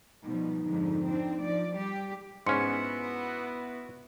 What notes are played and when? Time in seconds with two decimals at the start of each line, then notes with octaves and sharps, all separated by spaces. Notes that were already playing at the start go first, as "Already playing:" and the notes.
0.24 B2 F3 G3 D#4
0.65 F2 G#2 D3
1.05 C4 D4
1.39 F3 D5
1.74 G3 G4
2.46 G#2 B3 C#4 E4 F#4 C6 C#7